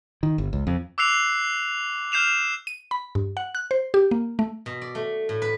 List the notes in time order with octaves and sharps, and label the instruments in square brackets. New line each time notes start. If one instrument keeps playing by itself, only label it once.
[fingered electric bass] D#3
G1
C#2
F2
[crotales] D6 E6 F#6 C7 F7
F6 G6 C7 E7 F7
[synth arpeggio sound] D#7
B5
G2
F#5
F#6
C5
G4
A#3
A3
[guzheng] B2
D5
A3
A2
B4